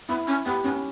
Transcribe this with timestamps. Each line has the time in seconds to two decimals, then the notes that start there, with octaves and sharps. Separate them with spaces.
0.09 B3 E4
0.27 C#4
0.45 B3 G4
0.64 B3 C#4